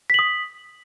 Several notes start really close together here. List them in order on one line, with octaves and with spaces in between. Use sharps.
B6 F#7 D#6